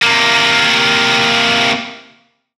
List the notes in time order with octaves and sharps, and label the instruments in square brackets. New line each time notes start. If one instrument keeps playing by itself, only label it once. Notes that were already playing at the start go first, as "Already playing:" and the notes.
[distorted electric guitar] C3 A#3